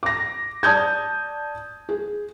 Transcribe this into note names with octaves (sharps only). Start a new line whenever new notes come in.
D6 A#6
D5 A5 D#6 G6 G#6
G#4